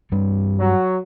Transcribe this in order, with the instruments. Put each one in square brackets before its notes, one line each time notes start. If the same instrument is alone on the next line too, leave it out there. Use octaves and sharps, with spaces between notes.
[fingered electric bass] G2 G3 C4
[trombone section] F#3